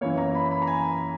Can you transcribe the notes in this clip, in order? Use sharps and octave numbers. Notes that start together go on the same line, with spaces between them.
F#2 E3 A#3 C#5
A#5
B5
A#5
B5
A#5
G#5